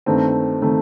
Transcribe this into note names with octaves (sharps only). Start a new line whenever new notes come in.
G2 D#3 A3 C4
D#3 A3 C4